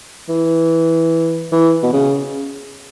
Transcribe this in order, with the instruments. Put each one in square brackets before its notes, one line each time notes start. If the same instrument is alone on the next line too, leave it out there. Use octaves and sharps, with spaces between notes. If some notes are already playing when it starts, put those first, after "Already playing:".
[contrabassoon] E3
E3
B2
C#3